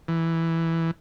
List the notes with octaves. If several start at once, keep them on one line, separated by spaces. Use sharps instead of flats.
E3